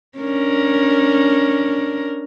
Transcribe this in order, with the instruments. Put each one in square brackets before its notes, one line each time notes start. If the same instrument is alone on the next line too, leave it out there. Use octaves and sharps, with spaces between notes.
[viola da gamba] C#4 D4 A#4